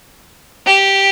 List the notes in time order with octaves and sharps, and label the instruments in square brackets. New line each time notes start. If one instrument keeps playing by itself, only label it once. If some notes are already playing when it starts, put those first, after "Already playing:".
[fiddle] G4